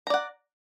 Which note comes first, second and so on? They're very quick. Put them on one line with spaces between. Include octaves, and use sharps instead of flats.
A#5 D5 F#5